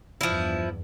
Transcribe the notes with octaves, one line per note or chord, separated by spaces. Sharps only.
E2 G2 F3 E4